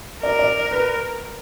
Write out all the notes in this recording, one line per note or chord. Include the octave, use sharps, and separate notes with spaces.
A#4 D5
D5
B4